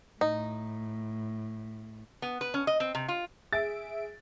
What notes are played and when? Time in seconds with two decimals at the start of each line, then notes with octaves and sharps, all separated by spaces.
0.21 A2 D#4
2.22 B3
2.41 B4
2.54 C#4
2.67 D#5
2.80 C4
2.95 C3
3.08 F4
3.53 G#4 E5 A6 D7